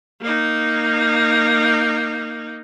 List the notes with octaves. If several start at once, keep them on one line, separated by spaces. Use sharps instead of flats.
A#3 D#4